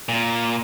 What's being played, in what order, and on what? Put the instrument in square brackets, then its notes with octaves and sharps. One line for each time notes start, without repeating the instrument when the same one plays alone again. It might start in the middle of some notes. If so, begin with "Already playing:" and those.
[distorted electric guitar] A#2